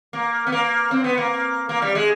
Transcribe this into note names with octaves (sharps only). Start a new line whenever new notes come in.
A#3
B3
A#3
C4
B3
A#3
A#3
G3
G#3